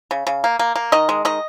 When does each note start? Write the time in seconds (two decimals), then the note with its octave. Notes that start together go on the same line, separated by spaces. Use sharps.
0.11 C#3
0.27 C#3
0.44 A#3
0.59 A#3
0.76 A#3
0.92 D#3 D#5
1.09 G#3
1.25 D#3 D#5